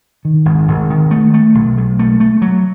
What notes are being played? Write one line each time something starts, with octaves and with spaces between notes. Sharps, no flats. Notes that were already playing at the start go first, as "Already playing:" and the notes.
D#3
G#1
G#1
D#3
A3
A3
B1
B1
A3
A3
F#3